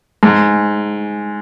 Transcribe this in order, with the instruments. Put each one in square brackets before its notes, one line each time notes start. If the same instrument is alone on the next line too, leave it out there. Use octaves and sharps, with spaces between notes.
[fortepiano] G#2